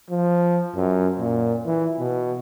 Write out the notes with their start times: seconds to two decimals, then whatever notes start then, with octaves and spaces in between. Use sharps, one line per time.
0.11 F3
0.76 F#2
1.19 A#2
1.65 E3
1.99 B2